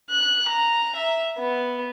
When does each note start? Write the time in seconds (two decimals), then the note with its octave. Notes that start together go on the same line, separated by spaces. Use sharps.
0.11 F#6
0.48 A#5
0.96 E5
1.39 B3